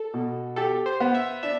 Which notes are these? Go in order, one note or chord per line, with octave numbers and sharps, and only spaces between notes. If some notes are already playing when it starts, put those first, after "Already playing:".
Already playing: A4
B2
G4 A4
C5
B3
E5
D4 E5